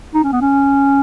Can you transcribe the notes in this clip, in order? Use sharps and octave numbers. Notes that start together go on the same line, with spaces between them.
D#4
C#4
B3
C#4